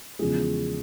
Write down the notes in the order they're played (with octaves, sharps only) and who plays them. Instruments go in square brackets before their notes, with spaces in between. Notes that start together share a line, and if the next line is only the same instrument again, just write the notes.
[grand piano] E2 C#3 F3 G#3 G#4